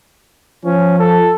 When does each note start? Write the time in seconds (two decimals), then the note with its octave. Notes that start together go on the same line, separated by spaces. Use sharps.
0.65 F3 C#4
0.99 A4